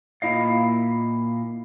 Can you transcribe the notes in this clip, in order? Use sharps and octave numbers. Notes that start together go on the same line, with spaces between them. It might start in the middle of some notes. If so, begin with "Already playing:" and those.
A#2 E4 D#5 F5